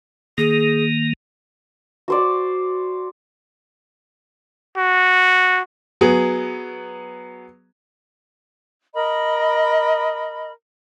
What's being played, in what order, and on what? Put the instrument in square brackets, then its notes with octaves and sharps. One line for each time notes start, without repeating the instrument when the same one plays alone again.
[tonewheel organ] D#3 A#3 [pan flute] G#4
[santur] F#4 C5 D5
[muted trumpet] F#4
[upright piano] F#3 B3 G#4
[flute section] A#4 D#5 B5